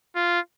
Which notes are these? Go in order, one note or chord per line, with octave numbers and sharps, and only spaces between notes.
F4